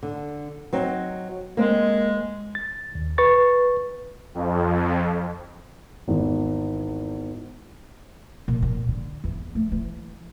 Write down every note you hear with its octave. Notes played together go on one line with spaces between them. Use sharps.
D3
F#3 C4 D#4
G#3 A#3 C4
A6
D#2
B4 C#6 A6
F2
G#1 E2
A#2
A#2
D3
E2
A3
E3